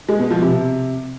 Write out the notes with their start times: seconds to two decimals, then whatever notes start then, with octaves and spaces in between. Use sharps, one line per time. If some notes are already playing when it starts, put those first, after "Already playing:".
0.09 G#3
0.20 B2
0.31 F3
0.42 C3